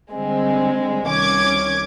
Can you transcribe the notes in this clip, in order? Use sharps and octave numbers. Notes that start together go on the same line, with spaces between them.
D3 G3 G#3 C4
C2 D#3 C#4 D6 G#6